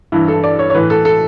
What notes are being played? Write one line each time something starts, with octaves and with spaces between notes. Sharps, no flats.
G2 E3 E4
A4
D5
C#5
C#5
A2 E3 B4
A4
A4